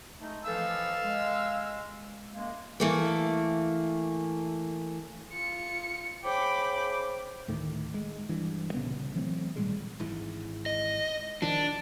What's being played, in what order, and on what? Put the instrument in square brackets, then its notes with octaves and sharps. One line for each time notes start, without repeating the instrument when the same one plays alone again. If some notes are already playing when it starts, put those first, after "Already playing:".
[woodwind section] G#3 A3 D#4
[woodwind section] E3 F3 A4 [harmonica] F5 E6
[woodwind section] G#3
F#2 G#3 A#3
[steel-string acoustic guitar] E3 A3 A#3
[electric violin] F4 C#7
[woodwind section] C#3 C5 D6 [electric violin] G5 B5
[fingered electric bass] D2 A2 D#3 A3
G#3
G2 E3
C2 A#2 C#3 B3
E3 F#3 A3 C4
G#1 A#2 G3 G#3
[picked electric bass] G#1 G#2 E3
[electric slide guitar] D#5
[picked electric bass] B1 D#3 F3 [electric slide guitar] D4